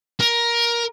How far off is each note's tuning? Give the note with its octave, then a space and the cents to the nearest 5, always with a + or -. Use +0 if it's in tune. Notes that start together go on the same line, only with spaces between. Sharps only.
A#4 +15